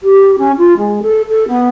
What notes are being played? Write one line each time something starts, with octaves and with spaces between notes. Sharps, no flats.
G4
C#4
F4
G#3
A4
A4
B3